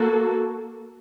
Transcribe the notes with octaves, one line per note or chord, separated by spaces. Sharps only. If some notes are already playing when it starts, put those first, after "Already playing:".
Already playing: A#3 F#4 A4